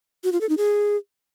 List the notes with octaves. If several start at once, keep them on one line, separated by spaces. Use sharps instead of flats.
F#4
F4
A4
D#4
G#4